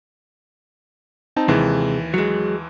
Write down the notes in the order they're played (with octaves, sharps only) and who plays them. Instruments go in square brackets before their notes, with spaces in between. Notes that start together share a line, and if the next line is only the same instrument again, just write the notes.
[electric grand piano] C4 D#4 A5
[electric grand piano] D#2 E3 [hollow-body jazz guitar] C3 G#3
[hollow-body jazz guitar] F#3 G#3